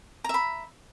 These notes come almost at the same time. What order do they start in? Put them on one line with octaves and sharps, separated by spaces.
A#5 E5 B5